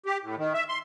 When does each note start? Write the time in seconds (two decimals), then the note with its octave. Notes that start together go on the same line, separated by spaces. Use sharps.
0.06 G4
0.23 A2
0.37 D#3
0.54 E5
0.69 C6